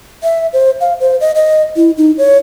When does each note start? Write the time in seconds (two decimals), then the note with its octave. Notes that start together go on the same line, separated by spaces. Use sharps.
0.23 E5
0.53 C5
0.81 F5
1.00 C5
1.21 D#5
1.35 D#5
1.76 E4
1.97 D#4
2.18 C#5